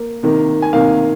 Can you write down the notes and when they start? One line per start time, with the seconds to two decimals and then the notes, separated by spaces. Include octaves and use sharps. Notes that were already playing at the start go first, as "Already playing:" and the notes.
Already playing: A#3
0.23 C3 D#3 A#3
0.62 G#5
0.73 C3 D#3 A#3 F5